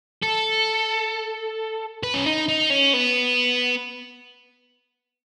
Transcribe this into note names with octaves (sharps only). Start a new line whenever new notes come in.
A4
B4
C#4
D#4
D#4
C#4
B3